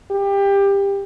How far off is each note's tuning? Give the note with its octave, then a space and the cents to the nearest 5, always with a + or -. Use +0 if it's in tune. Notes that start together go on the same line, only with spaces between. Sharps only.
G4 +20